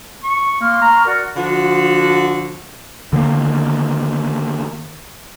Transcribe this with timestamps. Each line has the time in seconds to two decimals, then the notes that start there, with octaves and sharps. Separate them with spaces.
0.24 C#6
0.61 A#3 C6 C#6 F6
0.82 A#5
1.05 F#4 A#4 D5 F#5
1.37 D3 F3 F#4
3.13 D3 D#3 G#3 A#3